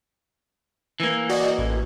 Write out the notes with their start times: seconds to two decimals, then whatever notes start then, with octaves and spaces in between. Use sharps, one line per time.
1.00 E3 A#3
1.29 F#4 D5 D#5
1.58 A1